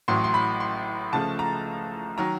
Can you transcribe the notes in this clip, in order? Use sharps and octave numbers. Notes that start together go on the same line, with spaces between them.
A1 A2 F#3 C6
C6
B5
C6
C#2 C#3 F3 A3 A5
A#5
D#3 F#3 A#5